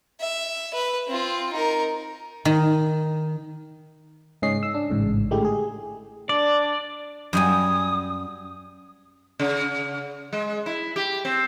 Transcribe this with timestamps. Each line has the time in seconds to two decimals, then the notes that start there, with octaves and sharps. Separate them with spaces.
0.20 E5
0.74 B4
1.08 C4 F4
1.53 D#4 A#4
2.45 D#3
4.42 G#2 C#3 C#4 D#5 C7
4.63 E6
4.74 D4
4.90 A1 G#2 C#3
5.31 D3 G#3 A3 E4 G4
5.45 G#4
6.29 D4 D5
7.33 F#2 G3 G#5 D#6
9.40 C#3
10.33 G#3
10.66 E4
10.96 G4
11.25 C4